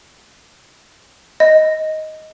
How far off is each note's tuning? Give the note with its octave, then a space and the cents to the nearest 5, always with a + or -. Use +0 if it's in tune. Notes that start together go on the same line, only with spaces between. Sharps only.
D#5 +10